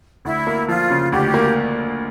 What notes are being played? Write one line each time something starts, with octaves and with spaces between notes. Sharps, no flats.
D2 E4
A#3
F3 F4
C#3
D2 G4
A#3